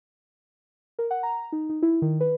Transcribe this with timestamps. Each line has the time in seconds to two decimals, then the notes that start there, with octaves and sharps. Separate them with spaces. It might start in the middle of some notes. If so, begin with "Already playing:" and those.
0.99 A#4
1.11 F#5
1.23 A#5
1.52 D#4
1.70 D#4
1.82 E4
2.02 D#3
2.20 B4